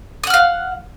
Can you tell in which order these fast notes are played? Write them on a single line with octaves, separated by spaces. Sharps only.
D#6 F#5 F6 F5